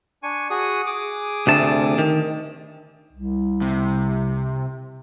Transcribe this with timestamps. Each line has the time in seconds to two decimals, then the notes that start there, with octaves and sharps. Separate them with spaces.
0.23 D4 G#5 C#6
0.50 F#4 G#4 D#6
0.87 G#4 D6 D#6
1.47 D2 C3 A5
1.98 D#3
3.13 C2
3.62 C3